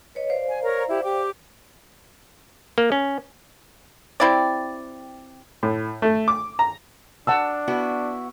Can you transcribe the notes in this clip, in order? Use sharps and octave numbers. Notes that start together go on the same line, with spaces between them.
B4 C#5 D#5
C5 D5 F5
G#5
A#4 C#5 A#5
E4 G4
G4 G5 D6
A#3
C#4
C4 E4 G4 D5
A2
A3
D6
A#5
D4 F#5 A5 E6
B3 E4 F#4